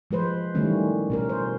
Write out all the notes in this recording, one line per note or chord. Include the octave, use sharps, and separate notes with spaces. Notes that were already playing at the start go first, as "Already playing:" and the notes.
F3 G#3 B4 C5
D#3 E3 G3 A3 C#4
B2 C#4 A#4
C5